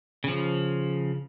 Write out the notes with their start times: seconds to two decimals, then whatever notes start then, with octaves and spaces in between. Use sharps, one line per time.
0.24 C#3 F3